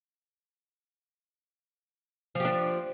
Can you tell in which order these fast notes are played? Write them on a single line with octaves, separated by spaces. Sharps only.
F3 G4 D4